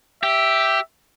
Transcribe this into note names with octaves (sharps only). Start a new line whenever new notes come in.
G4 E5